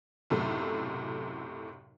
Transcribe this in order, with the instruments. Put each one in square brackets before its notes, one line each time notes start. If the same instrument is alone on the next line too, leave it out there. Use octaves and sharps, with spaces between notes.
[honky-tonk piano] B1 F#2 A2 C3 A3